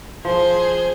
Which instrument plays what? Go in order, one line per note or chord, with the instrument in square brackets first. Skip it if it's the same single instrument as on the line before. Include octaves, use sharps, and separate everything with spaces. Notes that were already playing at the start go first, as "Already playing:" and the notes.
[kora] F3 [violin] G#4 C5